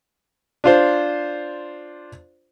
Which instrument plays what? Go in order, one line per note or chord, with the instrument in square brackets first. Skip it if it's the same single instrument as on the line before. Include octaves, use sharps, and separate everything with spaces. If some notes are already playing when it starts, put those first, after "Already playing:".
[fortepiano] D4 F4 C5